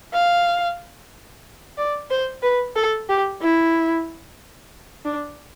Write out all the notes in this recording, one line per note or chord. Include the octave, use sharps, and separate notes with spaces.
F5
D5
C5
B4
A4
G4
E4
D4